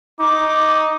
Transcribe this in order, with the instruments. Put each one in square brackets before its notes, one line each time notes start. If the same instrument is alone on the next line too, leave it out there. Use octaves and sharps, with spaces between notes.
[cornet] D#4 [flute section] D6